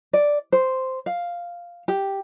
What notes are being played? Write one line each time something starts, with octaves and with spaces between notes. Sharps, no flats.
D5
C5
F5
G4